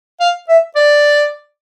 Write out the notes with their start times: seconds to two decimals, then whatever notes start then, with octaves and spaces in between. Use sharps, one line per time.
0.21 F5
0.49 E5
0.76 D5